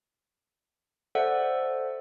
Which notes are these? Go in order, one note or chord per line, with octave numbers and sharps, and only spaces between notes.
A4 C5 D5 E5 F#5